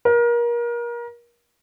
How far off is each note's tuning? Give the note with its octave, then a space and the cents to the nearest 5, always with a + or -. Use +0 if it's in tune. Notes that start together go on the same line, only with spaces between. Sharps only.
A#4 +30